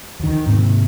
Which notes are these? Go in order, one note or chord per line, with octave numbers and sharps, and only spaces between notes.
D2 D#3
G#2 C3 A#3